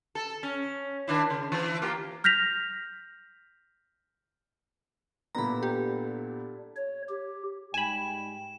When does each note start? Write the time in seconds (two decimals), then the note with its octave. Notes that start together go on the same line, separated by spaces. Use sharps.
0.15 A4
0.43 C#4
1.08 D#3 D4 E4
1.30 C#3
1.52 E3
1.82 A#3 F4 G4
2.24 F6 G6 A#6 B6 F7
5.35 A#2 D3 G3 B3 E4 A#5 B5
5.63 G4
6.77 C#5
7.09 G4
7.74 G#2 G3 G5 G#5 B5 E7